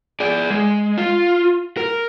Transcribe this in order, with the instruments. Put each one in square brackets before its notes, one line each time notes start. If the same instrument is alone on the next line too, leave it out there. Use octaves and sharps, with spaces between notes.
[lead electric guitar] G#4 D5
G#3
F4
A#4